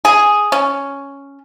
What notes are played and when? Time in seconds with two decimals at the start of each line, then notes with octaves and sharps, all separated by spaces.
0.05 G#4
0.52 C#4